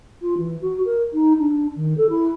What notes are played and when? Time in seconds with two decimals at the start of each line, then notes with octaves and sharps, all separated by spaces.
0.21 F4
0.37 E3
0.61 F#4
0.85 A#4
1.12 D#4
1.38 D4
1.75 D#3
1.97 A4
2.09 E4